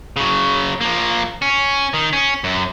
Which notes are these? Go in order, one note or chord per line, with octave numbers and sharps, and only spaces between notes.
C#3 F#3
F3 A#3
C#4
D#3
C#4
F#2